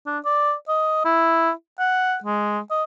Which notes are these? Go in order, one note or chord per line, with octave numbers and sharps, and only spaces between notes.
D4
D5
D#5
E4
F#5
G#3
D#5